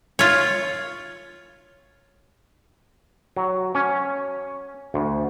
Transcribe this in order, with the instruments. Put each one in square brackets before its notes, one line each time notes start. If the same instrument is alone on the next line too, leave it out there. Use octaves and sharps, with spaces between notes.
[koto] F4 C#5
[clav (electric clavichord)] F#3
C#4
D2